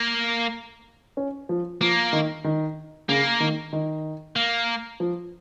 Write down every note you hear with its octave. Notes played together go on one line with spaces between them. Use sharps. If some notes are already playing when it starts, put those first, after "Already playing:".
Already playing: A#3
C#4
F3
F3 A#3
D#3
D#3
C#3 A#3
D#3
D#3
A#3
F3